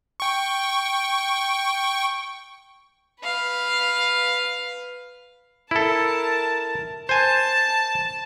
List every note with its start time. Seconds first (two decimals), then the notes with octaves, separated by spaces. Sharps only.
0.20 G5 C#6
3.22 B4 F5
5.71 E4 A4 A#4 A5
7.09 C5 G#5 A5